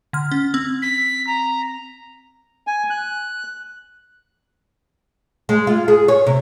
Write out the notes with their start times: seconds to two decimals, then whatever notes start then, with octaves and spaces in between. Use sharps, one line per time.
0.13 D3 F6
0.32 C#4
0.54 C4
0.82 B6
1.27 A#5
2.67 G#5
2.90 F#6
5.49 G#3
5.67 F4
5.88 G#4
6.08 C#5
6.27 C3